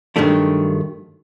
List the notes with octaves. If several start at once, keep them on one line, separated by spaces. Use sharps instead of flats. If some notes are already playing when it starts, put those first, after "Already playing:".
G2 D#3 F#3 G#3 A3 D4